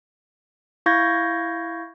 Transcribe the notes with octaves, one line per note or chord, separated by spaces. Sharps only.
E4 F5 C#6 G6 G#6 A#6